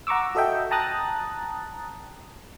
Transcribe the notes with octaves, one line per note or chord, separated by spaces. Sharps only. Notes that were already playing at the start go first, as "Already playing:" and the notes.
F#5 A#5 C#6 D6 E6
F#4 A4 D#5 E5 G5
G5 A5 A#5 D#6 F#6 A6